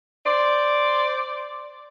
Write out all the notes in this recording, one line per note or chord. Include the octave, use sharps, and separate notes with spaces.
C5 D5